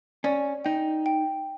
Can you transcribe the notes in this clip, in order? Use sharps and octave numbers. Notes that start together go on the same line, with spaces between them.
C#4 D5
D#4 G5
G5